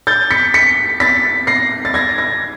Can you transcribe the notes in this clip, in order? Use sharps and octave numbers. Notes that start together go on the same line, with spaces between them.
G6 A6
B6 C#7
B6 C#7
A6 B6
A#6 C7
A6
G#6 A#6
G#6 A#6